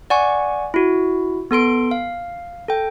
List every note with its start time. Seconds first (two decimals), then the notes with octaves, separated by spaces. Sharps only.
0.10 D5 F#5 G#5 C#6
0.74 E4 F#4
1.51 B3 A4 C6 D7
1.91 F5
2.68 A4 G5